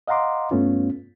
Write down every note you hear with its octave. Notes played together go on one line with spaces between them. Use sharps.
D#5 F5 F#5 A#5 C6 D6
G2 A3 B3 C#4 F4